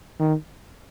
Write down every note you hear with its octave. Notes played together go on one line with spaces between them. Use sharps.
D#3